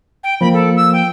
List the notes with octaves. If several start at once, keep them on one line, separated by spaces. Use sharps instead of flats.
G5
F3 A#3 B5
A4
E6
G5